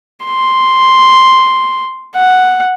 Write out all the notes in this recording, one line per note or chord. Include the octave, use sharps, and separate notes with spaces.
C6
F#5